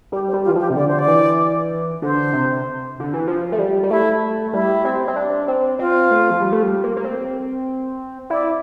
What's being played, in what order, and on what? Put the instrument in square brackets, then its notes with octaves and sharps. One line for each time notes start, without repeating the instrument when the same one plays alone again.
[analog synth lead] G3 [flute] G4
[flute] C5
[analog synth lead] G3
[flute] F4
[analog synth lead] E3
[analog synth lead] F3 [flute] G4
[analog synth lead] C3
[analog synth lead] D3 [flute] D5
[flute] C5
D5
[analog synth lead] E3
[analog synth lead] D3 [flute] C5
[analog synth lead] C3
D3
E3
F3
A3
G3
G3
[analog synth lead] A3 [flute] E4
[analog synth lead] G3 [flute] E4
[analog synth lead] C4
C4
D4
C4
[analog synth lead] C4 [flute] F4
[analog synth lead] A3
F3
G3
A3
G3
A#3
A#3
C4
[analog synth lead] E4 [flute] D5